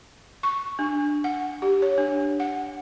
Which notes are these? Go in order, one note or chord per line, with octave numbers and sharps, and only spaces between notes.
C#6
D4
F#5
G4
C#5
D4
F#5